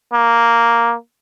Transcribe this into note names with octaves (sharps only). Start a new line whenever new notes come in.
A#3